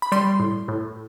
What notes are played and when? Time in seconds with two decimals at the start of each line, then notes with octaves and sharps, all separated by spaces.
0.02 B5
0.12 G3 C6
0.40 A2
0.68 A2